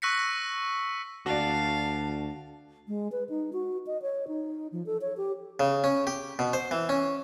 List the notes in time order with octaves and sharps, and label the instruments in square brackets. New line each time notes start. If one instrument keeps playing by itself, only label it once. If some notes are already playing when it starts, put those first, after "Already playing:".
[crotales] C#6 E6 F#6 A#6 B6 C#7
[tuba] D2 [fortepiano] F#4 D5 [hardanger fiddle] F5 [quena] A5
[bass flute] G#3
B4
D#4
F#4
D#5
C#5
D#4
F3
A4
C#5
G4
[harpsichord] C#3
C#4
G4
B2
C5
E3
C#4